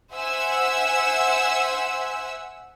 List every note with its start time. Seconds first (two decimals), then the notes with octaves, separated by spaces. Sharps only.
0.13 C5 E5 F#5 G#5 E6